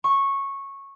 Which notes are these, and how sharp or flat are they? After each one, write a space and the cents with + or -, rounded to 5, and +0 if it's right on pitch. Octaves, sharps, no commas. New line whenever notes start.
C#6 -10